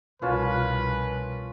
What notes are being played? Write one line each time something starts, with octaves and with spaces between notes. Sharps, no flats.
C2 B2 F3 C#4 F4 A#4 B4 A5